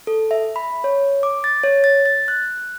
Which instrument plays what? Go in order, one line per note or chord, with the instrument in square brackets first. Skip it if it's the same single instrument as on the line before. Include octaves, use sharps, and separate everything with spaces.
[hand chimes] A4
E5
B5
C#5
D6
A6
C#5
A6
A6
F#6